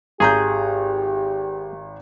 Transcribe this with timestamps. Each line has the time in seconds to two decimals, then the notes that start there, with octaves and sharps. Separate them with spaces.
0.20 G#1 G4 G#4 A#5 G6